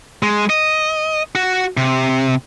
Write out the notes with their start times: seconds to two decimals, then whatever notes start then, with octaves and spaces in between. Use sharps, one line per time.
0.23 G#3
0.50 D#5
1.35 F#4
1.77 C3